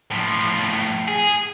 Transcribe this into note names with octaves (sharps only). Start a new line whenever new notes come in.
A2 F3
G#4